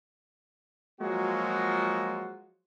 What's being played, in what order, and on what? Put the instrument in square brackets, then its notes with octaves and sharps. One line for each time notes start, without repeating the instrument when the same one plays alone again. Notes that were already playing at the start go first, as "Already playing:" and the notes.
[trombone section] F3 F#3 G#3 A#3 F4 F#4